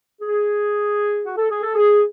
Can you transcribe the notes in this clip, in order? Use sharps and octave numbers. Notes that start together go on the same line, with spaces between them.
G#4
F#4
A4
G#4
A4
G#4